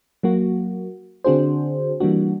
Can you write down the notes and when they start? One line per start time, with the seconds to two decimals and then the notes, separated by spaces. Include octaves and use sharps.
0.23 F#3 A#3 F#4
1.24 D3 C4 D4 F#4 G#4 C5
2.00 E3 G3 A#3 D4 F#4